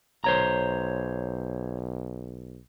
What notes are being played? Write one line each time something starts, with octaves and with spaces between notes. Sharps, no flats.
B1 C5 C#5 A#5